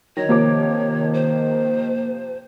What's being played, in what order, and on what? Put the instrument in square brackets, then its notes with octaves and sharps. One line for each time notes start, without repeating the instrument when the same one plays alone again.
[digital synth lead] D#3 [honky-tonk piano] F#3 [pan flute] C#5 [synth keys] A#6
[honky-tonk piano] C3 F3 D6 [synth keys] A#3
[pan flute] C5